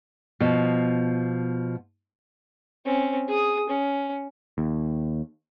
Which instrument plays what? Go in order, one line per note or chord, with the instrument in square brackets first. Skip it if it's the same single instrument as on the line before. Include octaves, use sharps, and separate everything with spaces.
[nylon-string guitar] B2 F3
[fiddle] C4 C#4
G#4 D#6
C#4
[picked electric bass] D#2